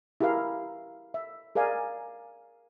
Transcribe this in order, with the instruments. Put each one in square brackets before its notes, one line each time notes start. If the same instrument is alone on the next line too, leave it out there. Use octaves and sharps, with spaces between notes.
[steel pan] E4 G4 G#4 A#4 F5
E5
G#4 A#4 D5 F5 G#5